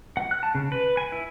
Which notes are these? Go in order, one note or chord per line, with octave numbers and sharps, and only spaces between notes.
F#5
F#6
A5
C#3
B4
G#5
E4